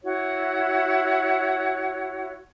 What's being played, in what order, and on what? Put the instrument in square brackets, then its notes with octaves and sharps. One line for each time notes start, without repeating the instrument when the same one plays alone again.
[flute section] E4 F#4 C#5